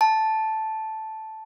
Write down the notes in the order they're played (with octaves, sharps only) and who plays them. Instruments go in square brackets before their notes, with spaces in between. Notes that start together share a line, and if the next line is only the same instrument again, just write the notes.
[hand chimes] A5